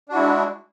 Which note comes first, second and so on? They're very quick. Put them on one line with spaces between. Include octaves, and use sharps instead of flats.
D4 F#4 E4 G#3